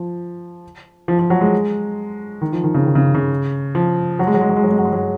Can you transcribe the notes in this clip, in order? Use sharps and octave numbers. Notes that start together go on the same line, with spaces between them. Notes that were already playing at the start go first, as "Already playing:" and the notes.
Already playing: F3
F3
F3
F#3
G#3
D#3
F3
D#3
C#3
D#3
C#3
C#3
F3
F#3
G#3
F#3
G#3
F#3
G#3
F#3
G#3
F#3
G#3
F#3